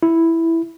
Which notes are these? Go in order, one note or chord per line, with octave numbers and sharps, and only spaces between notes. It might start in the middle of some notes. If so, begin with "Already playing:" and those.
E4